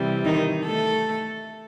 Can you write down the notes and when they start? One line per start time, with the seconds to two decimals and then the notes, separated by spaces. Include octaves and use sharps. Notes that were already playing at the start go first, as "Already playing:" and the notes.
Already playing: C3 E3 G3
0.25 D#3 D#4
0.65 A3 A4